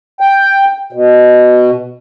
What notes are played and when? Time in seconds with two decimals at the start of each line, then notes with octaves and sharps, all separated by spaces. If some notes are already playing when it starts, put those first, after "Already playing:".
0.20 G5
0.92 B2